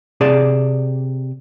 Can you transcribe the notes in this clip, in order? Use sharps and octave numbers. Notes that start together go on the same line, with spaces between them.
C3 G#4 D5 A5